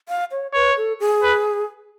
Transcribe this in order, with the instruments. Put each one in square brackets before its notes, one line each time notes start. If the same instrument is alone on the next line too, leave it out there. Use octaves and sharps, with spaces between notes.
[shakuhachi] F5
C#5
[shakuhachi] B4 [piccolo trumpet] C#5
[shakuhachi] A4
G#4
[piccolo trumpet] B4